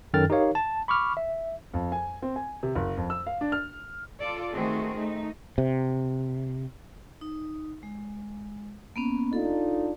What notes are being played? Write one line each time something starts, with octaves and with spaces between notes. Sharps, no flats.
F#2 D#3 A4 G5 F6 A6
D#4 G4 A#4 C#5 F5
A5
B5 C#6 D6 F6
E5
F2
G#5
C4
G#5
C3
F#1
F2
E6
F5
D4
F6
F4 A4 D5
D#3 A3 C4 F#4 G#4
A3 D#4
C3
D#4
G#3
A#3 B3 C#4
D4 D#4 F4 A4